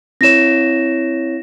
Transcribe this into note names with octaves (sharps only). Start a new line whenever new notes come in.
C4 E4 C#5 A#6 E7